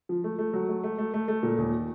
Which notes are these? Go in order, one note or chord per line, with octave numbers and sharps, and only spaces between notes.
F3
A3
A3
F#3
A3
A3
A3
A3
A3
A#2
D#2